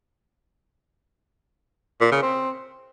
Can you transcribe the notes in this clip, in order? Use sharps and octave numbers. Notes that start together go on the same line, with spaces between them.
A#2
C#3
C4